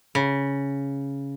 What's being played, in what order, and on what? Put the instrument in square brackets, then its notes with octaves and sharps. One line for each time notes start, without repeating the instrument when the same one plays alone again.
[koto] C#3